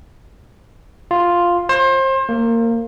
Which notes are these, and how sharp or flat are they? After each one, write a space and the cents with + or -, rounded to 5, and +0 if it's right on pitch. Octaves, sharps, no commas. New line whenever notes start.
F4 +0
C5 +30
A#3 -20